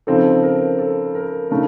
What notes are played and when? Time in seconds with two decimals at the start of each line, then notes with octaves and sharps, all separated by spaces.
0.07 C#3 F3 C4 D#4 A4
0.43 A#4
0.79 A4
1.15 A#4
1.50 C#3 A3 D#4 A#4